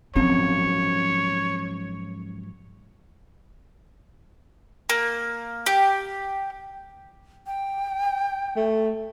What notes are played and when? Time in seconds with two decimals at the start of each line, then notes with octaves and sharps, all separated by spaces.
0.16 G#2 F3 F#3 C4 C#4 C#5
4.90 A#3
5.66 G4
7.47 G5
8.56 A3